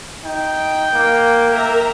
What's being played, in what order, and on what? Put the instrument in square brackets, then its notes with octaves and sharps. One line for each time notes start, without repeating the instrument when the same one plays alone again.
[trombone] D#4 [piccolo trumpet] G5
[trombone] A#3
[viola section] A#4 E5 A#5